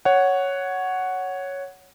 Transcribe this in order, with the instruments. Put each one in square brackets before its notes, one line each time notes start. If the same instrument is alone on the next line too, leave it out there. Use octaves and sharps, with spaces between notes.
[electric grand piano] C#5 F#5